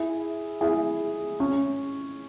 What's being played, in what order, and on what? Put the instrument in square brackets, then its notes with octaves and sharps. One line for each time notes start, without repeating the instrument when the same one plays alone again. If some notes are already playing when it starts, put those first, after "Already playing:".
Already playing: [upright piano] E4 G#4
E4 G#4
C#4